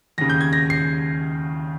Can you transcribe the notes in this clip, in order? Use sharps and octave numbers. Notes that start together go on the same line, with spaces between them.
D#2 C#3 A#6
G6
G#6
A#6
C7